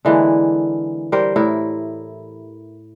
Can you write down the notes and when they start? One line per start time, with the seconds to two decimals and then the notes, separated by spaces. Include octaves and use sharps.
0.05 D3 E3 G#3 A#3
1.12 G3 G4 A#4 C5
1.36 A2 E4 A#4